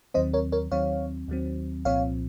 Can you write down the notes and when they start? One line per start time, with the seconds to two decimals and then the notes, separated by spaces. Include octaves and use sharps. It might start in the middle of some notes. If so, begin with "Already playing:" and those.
0.14 D#2 D#3 F#3 C4 C5 D#5
0.33 A#4 C#5
0.52 A#4 C#5
0.71 D#2 D#3 F#3 C4 C#5 F5
1.28 D#2 D#3 F#3 C4
1.85 C2 A#2 F3 C4 C#5 F5